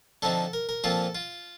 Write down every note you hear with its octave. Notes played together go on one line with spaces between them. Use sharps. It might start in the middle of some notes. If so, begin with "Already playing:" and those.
D3 F3 C4 D#4 A4
A#4
A#4
A#2 F3 C4 F4 A4
F4